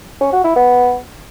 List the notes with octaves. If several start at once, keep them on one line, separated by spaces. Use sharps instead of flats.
C#4
F#4
E4
B3